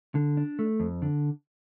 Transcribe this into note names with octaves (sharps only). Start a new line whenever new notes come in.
D3
D4
A3
F2
D3